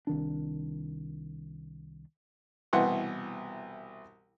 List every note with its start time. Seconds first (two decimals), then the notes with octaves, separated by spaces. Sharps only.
0.07 C2 D#3 D4
2.73 C2 B2 E3 F#5 C6